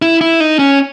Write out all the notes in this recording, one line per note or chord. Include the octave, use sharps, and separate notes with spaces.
E4
E4
D#4
C#4